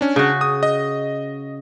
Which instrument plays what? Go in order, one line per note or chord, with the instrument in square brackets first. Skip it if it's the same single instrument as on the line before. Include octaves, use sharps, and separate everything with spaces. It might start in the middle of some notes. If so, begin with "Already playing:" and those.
[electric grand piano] C#4 D4
[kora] C#3 F#4
[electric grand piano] D#6
D#5